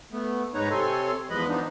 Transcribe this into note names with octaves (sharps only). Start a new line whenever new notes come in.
A3 B3
G#2 G#3 D#4 B4 C#5 A#5
C3 C4 A4 C#5 G#5 C6
E2 F3 G#3 B4 D#5 B5
E3 F3 B3 D4 D#4